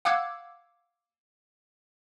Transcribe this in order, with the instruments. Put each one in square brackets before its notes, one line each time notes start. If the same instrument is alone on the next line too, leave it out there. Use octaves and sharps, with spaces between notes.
[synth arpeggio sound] F5 F#5 D6 E6 F#6 G#6